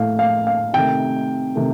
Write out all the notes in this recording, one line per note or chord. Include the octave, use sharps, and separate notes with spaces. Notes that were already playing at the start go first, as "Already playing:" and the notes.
Already playing: A2 A3 F5
F5
F5
C3 D#3 A3 G5
C3 D#3 A3